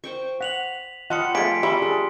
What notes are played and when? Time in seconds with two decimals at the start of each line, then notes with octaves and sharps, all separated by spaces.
0.04 C5 G5 C#6
0.41 F#5 B6 F7 F#7
1.10 G3 F4 G4 D#5 F#5 A5 C6 C#7
1.35 F3 A3 G#5 B6 D7
1.63 G3 E4 A#5 C6 C#6
1.82 D4 G#4